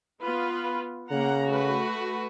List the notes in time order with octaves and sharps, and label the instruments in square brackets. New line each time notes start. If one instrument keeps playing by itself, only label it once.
[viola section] B3 F4 B4
[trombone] C#3 [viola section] A#3 F#5 A#5
[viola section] A3 F#4 B4